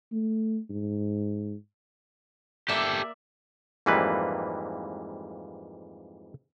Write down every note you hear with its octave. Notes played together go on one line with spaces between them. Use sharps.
A3
G#2
A#3 G4 A4 D5 E5
F2 G#2 E3 G3 A#3 B4